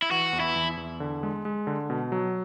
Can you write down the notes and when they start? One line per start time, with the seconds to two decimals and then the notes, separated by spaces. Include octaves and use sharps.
0.02 E4
0.11 E3 F#4
0.33 E2
0.40 E4
0.56 E2
0.77 E2
1.00 D3
1.23 G#3
1.45 G#3
1.67 D3
1.90 B2
2.12 F#3